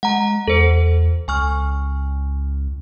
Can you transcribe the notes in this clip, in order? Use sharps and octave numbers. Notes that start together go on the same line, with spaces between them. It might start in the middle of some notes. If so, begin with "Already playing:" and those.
G#3 F#5 A#5
E2 A4 C5
C#2 G#5 C#6 F6